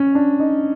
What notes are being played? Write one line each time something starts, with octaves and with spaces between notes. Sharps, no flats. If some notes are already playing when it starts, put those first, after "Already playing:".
Already playing: C#4
D4
D#4